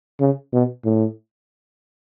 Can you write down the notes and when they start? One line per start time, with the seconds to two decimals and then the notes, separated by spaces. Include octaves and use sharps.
0.20 C#3
0.53 B2
0.85 A2